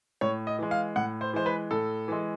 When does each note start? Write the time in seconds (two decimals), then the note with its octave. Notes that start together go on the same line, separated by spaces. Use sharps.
0.21 A2 C#5
0.47 D#5
0.59 E3 G#3
0.71 F5
0.96 A2 F#5
1.21 C5
1.33 E3 G#3 C5
1.46 B4
1.71 A2 A4
2.08 E3 G#3